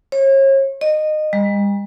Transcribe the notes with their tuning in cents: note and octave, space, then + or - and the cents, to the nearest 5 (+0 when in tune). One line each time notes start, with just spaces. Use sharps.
C#5 -35
D#5 -20
G3 +45